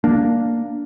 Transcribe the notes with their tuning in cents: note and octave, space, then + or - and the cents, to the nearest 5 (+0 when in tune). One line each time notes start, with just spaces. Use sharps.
A#3 +0 D4 +0